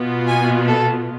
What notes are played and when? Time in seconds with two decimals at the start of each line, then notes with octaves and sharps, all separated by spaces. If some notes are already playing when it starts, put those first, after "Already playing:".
Already playing: B2 B3 F4
0.28 G#5
0.68 A4